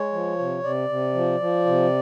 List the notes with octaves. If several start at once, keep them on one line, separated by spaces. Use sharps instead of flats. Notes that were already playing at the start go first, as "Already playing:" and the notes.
Already playing: G#3 C#5
F3
C3
C3 D5
C3
F3
F3
C3